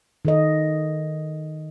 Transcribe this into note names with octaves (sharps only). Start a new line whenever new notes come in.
D#3 A4 D#5